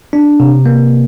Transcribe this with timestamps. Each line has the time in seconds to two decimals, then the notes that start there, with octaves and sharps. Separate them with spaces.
0.13 D4
0.40 C3
0.66 A#3